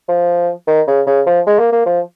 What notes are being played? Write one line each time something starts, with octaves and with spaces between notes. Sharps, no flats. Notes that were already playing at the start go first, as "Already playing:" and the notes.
F3
D#3
C#3
C#3
F3
G#3
A#3
A#3
F3